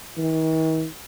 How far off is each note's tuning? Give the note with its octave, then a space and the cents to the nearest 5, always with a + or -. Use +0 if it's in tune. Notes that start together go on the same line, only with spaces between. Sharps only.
D#3 +45